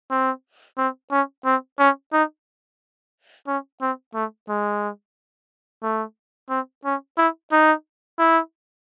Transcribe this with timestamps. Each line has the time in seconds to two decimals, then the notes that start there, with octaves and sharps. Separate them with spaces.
0.11 C4
0.78 C4
1.12 C#4
1.45 C4
1.79 C#4
2.13 D#4
3.48 C#4
3.81 C4
4.15 A3
4.49 G#3
5.83 A3
6.50 C4
6.85 C#4
7.18 E4
7.52 D#4
8.19 E4